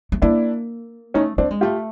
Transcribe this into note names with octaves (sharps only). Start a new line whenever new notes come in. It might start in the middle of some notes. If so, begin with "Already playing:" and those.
A3
A#3 D4 E4
A3 C#4 D#4
A3 C4 D4
G#3
A3 F4 G4